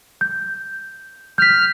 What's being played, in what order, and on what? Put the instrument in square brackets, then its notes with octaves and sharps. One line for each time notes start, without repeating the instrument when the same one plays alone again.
[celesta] G6
[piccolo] F6 [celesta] G6 B6